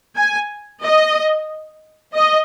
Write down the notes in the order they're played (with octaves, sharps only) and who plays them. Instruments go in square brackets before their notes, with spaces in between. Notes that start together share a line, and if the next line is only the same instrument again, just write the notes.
[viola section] G#5
D#5
D#5